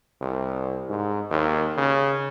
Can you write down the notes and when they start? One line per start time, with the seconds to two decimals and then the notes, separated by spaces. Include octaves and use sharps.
0.21 C2
0.89 G#2
1.30 D#2
1.77 C#3